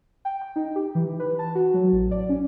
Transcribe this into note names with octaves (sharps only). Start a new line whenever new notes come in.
G5
G5
D#4
G4
E3
B4
A5
F#4
F#3
A1
D5
C#4